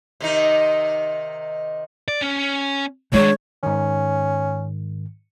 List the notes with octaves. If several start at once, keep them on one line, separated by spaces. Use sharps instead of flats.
C3 D#3 D#4
D5
C#4
D#3 G#3 D4 C#5
G#2 D#3 C#4